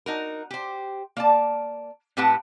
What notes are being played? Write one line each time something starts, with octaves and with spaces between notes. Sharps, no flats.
D#4 F#4 A#4
G4 C5
A#3 D5 A5
A2 C4 G4 B4 F#5 A5